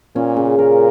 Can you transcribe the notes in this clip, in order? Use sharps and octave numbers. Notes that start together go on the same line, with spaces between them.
A#2 C#4
C#3
A#2 A#4